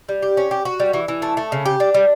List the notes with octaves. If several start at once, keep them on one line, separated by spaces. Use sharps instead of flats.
G3
G4
C#4
G4
F#4
G3
E3
E3
A3
A3
C#3
G4
D4
G3